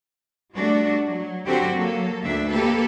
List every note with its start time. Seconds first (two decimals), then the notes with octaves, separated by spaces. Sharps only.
0.54 G3 A3 D4 F#4
1.09 F#3
1.46 D3 F#3 C4 F#4 G4 A4
1.76 F#3 A#3 A4
2.21 D2 A3 D4 E5
2.51 A#3 G4 A4 B4